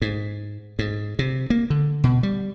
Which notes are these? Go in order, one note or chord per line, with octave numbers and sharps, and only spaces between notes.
G#2
G#2
C3
A#3
D3
B2
G3